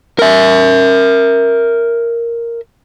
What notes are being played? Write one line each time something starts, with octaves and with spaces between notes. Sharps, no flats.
A#4 E5